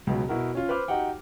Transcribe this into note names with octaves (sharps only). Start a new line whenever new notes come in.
C#2 B2 F#3
B2 E4 F#4 A#4
C#4 F4
B4 C5 D6 F6
D#4 F#4 G4 F#5 G5